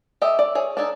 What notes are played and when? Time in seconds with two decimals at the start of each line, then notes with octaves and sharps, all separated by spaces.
0.22 G4 A4 D#5 E5
0.39 D5
0.55 G#4 C#5
0.77 D4 D#4 A4 G#5